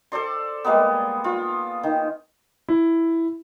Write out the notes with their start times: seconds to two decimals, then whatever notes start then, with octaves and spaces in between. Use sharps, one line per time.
0.12 A4 C5 D5 C6
0.64 G3 G#3 A#3 B3
1.24 F4
1.83 D#3
2.69 E4